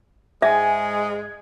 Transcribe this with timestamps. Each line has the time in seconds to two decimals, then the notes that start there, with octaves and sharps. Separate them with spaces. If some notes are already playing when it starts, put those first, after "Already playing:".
0.42 G#2 G#3 E5 G#5